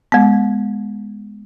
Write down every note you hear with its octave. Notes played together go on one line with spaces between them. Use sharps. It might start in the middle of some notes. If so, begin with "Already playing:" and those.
G#3 B3